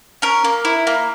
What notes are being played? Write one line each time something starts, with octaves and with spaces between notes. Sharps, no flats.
C#4 A#4
A#3
E4
A#3